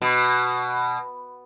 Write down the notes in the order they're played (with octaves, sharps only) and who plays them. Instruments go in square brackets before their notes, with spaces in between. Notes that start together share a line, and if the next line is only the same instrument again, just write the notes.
[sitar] B2